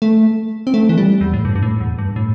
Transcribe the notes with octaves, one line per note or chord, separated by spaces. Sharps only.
A3
C4
A3
E3
G3
E2
A2
G2
G2
A2
E2
G2
A2